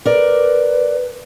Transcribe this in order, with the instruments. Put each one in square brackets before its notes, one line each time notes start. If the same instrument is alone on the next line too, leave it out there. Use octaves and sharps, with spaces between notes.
[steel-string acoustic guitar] A#4 D5 [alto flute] B4